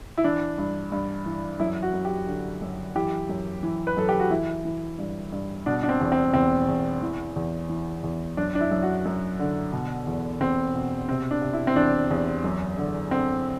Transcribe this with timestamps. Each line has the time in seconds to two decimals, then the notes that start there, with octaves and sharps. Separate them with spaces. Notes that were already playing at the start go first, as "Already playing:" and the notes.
0.18 E4
0.24 E3 D4
0.58 G2
0.92 G2
1.26 E3
1.60 F#2 E4
1.82 F#4
1.94 F#2
2.05 G4
2.27 D3
2.62 F#2
2.95 E3 G4
3.29 F#2
3.63 E3
3.87 B4
3.97 F#2 A4
4.09 G4
4.20 F#4
4.30 E3 E4
4.65 E3
4.99 G2
5.32 G2
5.66 B2 D4
5.83 D4
5.89 C4
6.01 E2
6.12 C4
6.33 E2 C4
6.68 E2
7.02 E3
7.36 E2
7.69 E3
8.03 E2
8.37 F#2 D4
8.55 D4
8.60 E4
8.71 F#2
8.83 F#4
9.06 F#2
9.39 D3
9.73 B2
10.07 E2
10.40 E2 C4
10.75 B2
11.08 C3 C4
11.31 D4
11.42 C3
11.53 E4
11.67 C4
11.76 E2 D4
12.11 E2
12.44 F#2
12.78 D3
13.11 D3 C4